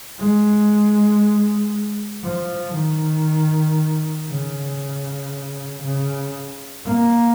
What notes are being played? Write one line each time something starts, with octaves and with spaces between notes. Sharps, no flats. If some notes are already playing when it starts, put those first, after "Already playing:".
G#3
F3
D#3
C#3
C#3
A#3